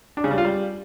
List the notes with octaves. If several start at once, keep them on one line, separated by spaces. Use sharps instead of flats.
D4
C#3
G3
F4
G3